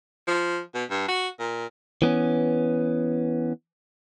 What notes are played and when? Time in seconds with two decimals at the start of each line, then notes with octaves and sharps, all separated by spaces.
0.28 F3
0.75 B2
0.90 G2
1.08 F#4
1.39 A#2
2.02 E3 B3 C#4